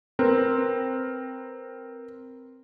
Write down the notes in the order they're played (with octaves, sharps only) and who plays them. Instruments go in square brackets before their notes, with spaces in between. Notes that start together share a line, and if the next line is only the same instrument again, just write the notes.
[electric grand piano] C4 A#4 B4